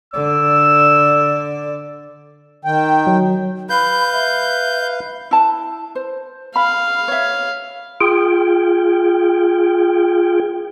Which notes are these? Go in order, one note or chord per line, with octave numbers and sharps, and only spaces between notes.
D3 D5 E6
D#3 G5
F#3
B4 F5 B5 G6
E5
E4 A5
C5
F5 B5
C#5 E5
F4 G#4 G5